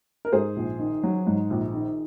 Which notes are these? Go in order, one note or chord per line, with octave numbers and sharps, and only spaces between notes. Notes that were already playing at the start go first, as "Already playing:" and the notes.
A#4
G#2 G#4 C5
A#1
D#3
F#3
G#2
A#1
D#3